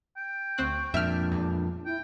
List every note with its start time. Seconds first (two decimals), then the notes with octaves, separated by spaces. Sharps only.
0.16 G5
0.58 D2 C4 C#6 F#6
0.94 F2 A#2 D4 E5 F6
1.32 E2
1.86 E4 G5